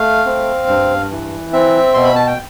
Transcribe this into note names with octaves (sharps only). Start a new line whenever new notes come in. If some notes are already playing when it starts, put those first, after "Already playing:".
Already playing: A3 F5
C4
G2
E3
C4 E5
B2 C6
B5
A5
G5